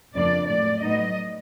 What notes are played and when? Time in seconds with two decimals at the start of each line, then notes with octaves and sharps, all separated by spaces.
0.15 F2 C#3 F3 A#3 D4 D5
0.48 A2 F#3 A3 D5
0.82 A2 F#3 B3 D#4 D#5